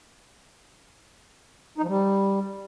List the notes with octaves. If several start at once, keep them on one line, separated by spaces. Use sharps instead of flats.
D#4
F3
G3